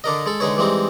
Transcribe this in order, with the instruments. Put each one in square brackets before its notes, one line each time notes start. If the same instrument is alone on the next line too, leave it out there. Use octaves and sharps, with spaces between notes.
[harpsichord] D3 D4 A#4 D#5
G#3 A4
D3 G#3 D#4 B4 C#5
E3 G3 G#3 C4 D#4